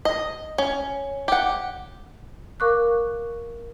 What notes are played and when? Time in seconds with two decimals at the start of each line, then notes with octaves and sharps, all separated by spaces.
0.05 D#5
0.58 C#4
1.28 G4 F#5
2.60 A#4 F5 C#6 D6 F#6